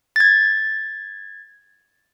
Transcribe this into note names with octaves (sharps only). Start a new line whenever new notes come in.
G#6 A6